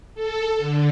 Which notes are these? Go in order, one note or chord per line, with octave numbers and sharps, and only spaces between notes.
A4
D3